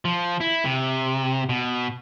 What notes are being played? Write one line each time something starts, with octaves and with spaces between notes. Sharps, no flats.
F3
E4
C3
B2